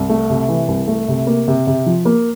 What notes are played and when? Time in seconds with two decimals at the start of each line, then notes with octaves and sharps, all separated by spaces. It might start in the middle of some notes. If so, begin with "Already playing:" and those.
Already playing: C2
0.09 A3
0.30 C3
0.49 E3
0.68 C2
0.88 A3
1.08 C3
1.27 A#3
1.48 C3
1.67 C3
1.86 F3
2.05 A#3